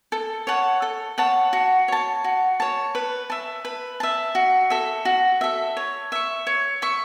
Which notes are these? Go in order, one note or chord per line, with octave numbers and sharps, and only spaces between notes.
A4
C#5 F#5 A5
A4
C#5 F#5 A5
F#4
C#5 A5
F#4
C#5 A5
B4
E5 A5
B4
E5 A5
F#4
A4 E5
F#4
A4 E5
C#5
E5 C#6
C#5
E5 C#6